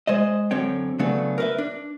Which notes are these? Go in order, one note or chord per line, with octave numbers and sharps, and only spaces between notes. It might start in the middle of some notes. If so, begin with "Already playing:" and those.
G#3 C5 D#5
F#2 D3 C4 C#5 G5
C#3 F#3 A3 B3 D4
A#4 B4 E5
D4